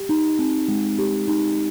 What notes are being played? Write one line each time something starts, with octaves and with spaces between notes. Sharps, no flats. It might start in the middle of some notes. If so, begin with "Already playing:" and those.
Already playing: G4
D#4
C4
G#3
G4
D#4